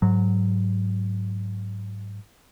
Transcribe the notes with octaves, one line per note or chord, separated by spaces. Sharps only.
G#2 F#3